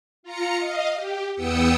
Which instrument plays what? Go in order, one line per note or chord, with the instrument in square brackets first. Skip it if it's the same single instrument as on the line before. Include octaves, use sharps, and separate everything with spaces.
[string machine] F4 A#5 C#7
D#5 F5
G4
E2 B3 G5 D#6 E6 C#7